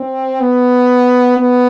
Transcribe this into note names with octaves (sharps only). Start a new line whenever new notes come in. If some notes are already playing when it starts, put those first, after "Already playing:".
Already playing: C4
B3
B3